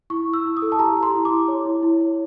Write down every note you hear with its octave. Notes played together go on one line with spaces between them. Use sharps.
E4 C#6
E4
E6
E4
D#6
A4
A5
G4 A#5
G4
C6
E4
D6
E4
C#5
E4
E4
C#5